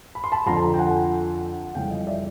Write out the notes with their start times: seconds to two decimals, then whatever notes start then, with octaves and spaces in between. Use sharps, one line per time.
0.15 B5
0.24 C6
0.32 A5 B5
0.46 F2 D3 F3 A#5 C6
0.74 G5
0.79 F#5 G#5
1.65 F#5
1.75 F2 C#3 E3 G3 F5 G5
1.91 D#5 F5
2.07 D5 E5